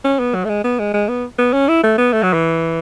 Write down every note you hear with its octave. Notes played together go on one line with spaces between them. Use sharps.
C#4
B3
F#3
A3
G#3
B3
G#3
G#3
B3
B3
C#4
E4
A3
B3
A3
F#3
E3